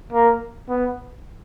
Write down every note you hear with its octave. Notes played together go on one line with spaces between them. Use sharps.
A#3
B3